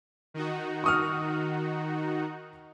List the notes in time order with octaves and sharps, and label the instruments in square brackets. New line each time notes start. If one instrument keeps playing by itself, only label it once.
[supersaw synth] D#3 D#4 F#4
[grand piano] C#6 D#6 F6